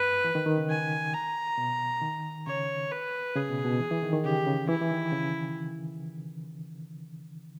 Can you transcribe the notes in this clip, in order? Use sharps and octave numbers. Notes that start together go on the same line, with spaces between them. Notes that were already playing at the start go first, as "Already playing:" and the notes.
Already playing: G2 B4
E3
D#3
D#3
C#3
G#5
A#5
B2
D#3
C#3 C#5
B4
C#3 G#4
B2
B2
E3
E3
D#3
D#3
C#3 G4
C#3
E3 E4
E3
D#3
C#3